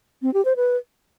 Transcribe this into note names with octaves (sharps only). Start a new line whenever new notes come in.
C4
G4
C5
B4